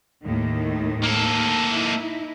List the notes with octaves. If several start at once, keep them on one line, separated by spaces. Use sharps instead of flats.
D#2 A2 D#3
A#3 A4
D#4 E4